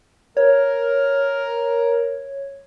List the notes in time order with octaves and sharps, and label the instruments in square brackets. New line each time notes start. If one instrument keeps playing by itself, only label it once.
[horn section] A#4 [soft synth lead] C#5